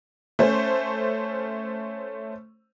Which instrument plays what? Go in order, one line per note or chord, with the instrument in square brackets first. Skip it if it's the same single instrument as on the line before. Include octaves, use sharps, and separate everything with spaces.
[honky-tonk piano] A3 C#4 C5